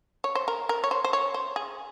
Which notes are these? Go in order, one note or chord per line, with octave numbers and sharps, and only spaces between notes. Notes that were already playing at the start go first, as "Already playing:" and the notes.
C#5
C5
A#4
A#4
C#5
C5
C5
C#5
C5
G#4